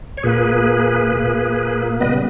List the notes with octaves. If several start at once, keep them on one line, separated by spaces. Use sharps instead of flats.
C#5
A#2 A#3 G#4 B4
A#2 A#3
C#3 G3 B3 B4 D#5